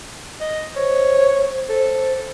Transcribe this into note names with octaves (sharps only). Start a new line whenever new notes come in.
D#5
C5 C#5
A4